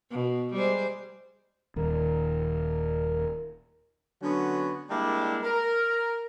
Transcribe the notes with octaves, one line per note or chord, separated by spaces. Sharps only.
B2
G3 G#3 C5
D#1 D#2 A#4
D3 F#3 B3 C#4 F#4
G3 G#3 A#3 D4 E4
A#4